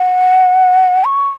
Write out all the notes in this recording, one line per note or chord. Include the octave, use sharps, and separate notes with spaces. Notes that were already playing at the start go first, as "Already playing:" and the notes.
Already playing: F#5
C#6